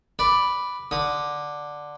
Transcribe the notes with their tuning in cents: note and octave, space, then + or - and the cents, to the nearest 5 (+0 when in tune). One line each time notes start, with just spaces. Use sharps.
B4 +0 D5 +0
D3 +0 D#6 +0